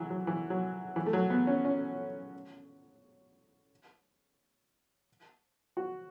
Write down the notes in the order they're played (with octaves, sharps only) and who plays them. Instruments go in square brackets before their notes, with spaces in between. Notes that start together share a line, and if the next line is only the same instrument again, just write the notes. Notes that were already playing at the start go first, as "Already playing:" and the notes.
Already playing: [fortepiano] E3 F#3
F#3
E3
F#3
E3
A3
F#3
B3
C#4
C#4
F#4